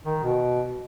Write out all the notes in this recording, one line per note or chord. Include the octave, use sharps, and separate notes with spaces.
D#3
B2